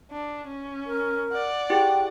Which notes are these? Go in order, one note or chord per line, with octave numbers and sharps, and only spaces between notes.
D4
C#4
A#4
D5 F#5
E4 G4 G#4 G5